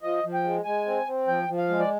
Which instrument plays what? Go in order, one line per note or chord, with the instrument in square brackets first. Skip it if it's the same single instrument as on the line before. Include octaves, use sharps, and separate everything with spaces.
[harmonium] F3 D#5
F3
G5
G#3
G#3 G#5
C4
C4
F3 G5
F3
F5
G#3
D5